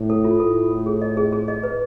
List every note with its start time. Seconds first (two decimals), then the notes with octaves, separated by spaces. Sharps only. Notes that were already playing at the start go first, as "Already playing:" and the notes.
Already playing: A2
0.10 A4
0.24 F4
0.39 A2 A4
0.56 F4
0.71 A4
0.86 G#4
1.02 D#5
1.17 G#4
1.32 G#4
1.48 D#5
1.63 B4